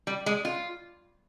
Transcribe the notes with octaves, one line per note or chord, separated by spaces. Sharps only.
G3
G#3
F4